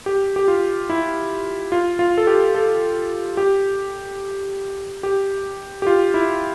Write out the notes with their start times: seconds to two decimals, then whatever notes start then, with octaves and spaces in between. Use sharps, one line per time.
0.06 G4
0.36 G4
0.48 F4
0.90 E4
1.72 F4
1.99 F4
2.18 A4
2.27 G4
2.55 A4
3.37 G4
5.03 G4
5.82 G4
5.87 F4
6.14 E4